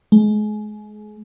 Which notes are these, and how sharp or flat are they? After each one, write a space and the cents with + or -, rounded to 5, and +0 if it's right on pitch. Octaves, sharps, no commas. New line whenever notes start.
G#3 +30